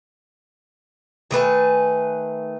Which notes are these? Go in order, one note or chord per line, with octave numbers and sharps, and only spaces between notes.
D#3 A3 B4 G#5